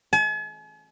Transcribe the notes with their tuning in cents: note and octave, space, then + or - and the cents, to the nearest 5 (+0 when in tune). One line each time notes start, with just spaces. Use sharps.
G#5 +45